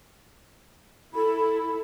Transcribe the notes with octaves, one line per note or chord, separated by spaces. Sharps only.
E4 A4 B5